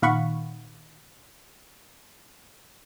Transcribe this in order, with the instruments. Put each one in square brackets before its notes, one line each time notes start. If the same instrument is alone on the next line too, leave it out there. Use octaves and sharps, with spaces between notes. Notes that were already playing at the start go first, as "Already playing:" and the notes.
[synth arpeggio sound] A#2 D#3 F5 F#5 B5 C#6